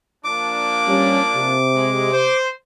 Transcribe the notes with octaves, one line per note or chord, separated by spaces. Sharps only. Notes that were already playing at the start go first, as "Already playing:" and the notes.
F3 A#3 D4 D6
G3 C#4
C3
G#3
C5